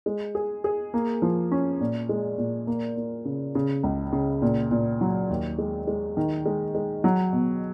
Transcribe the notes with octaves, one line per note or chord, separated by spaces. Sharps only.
G#3
G#4
G#4
A#3
F3
C#4
A#2
G#3
A#2
A#3
A#3
C#3
C#3
C#2
C#3
A#2
A#2
F#3
D#2
G#3
G#3
D#3
G#3
G#3
F#3
B2